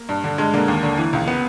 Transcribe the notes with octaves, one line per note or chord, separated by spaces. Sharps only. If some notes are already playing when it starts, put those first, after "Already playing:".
Already playing: A#3
G2
D3
G2 G#3
D3 A#3
D#2
D3
E3
C#2
B3